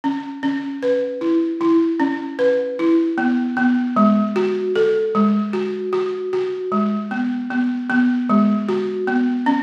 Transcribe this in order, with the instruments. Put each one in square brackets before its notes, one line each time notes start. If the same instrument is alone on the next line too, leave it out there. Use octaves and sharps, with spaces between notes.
[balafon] C#4
C#4
B4
E4
E4
C#4
B4
E4
B3
B3
G#3
F#4
A4
G#3
F#4
F#4
F#4
G#3
B3
B3
B3
G#3
F#4
B3
C#4